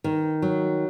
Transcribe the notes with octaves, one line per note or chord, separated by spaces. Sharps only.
D#3
F#3